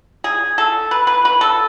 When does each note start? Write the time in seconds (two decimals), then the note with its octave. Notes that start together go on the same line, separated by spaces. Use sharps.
0.24 G#4
0.58 A4
0.91 B4
1.07 B4
1.25 B4
1.41 A4